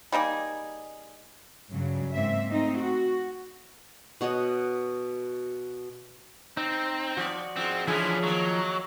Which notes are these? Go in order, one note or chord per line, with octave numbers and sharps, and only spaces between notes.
G3 A#3 D#4 G#4
G2 C#3 F#3
G#2 A#3 C4 E5
A3 C4 D#4
F#4
B2 F#4 C#5 D#5
C4 D#4
F3 F#4 D5
G#2 F3 C4
D3 E3 F3 C#4 E4 G#4 D#6
D#3 F#3 A#3